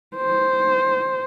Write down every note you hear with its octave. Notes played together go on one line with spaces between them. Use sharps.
C5